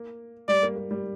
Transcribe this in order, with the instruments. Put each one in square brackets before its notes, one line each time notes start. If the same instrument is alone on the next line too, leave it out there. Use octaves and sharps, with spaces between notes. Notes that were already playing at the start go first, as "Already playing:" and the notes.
Already playing: [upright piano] A#3
[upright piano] G3 [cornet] D5
[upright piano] A#3
A#3
G3